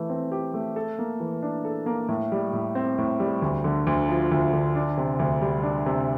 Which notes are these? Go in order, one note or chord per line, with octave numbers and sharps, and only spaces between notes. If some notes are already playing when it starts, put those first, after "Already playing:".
Already playing: E3 A3
C4
G4
A3
A4
A#3
E3
D4
A4
A#3
A2
G3
A2
C4
A2
G3
D2
D3
D2
F3
D2
D3
D4
C3
D2
G3
D4
C3